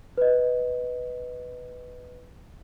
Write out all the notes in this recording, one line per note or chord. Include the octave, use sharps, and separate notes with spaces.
B4 D#5